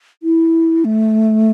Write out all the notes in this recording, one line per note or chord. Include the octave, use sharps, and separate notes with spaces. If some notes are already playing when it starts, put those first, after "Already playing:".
E4
A3